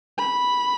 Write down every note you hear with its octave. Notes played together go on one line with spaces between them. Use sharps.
B5